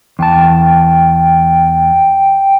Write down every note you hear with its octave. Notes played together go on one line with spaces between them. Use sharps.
E2 G5 A5